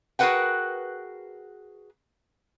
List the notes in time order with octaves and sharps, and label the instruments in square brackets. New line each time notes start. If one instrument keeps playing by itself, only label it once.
[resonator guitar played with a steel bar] F#4 G#4 A#4 B4 F#5 G5